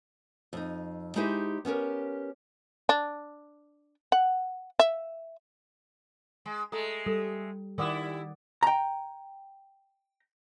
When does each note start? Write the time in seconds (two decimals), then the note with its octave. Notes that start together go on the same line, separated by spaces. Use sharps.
0.53 F2 D#4
1.16 G#3 D#4 E4 G4 G#4 C5
1.65 B3 C#4 G4 A#4
2.89 D4
4.12 F#5
4.79 E5
6.46 G#3
6.72 G#3 A3 A4 A#5
7.06 G3 A4
7.78 D#3 G3 E4 A#4 D5 F#5 D6 D#6
8.63 G5 A#5